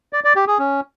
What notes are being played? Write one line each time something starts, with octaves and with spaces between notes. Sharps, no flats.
D5
D5
G4
G#4
C#4